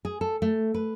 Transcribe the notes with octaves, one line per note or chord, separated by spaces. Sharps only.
G#4
A4
A3
B4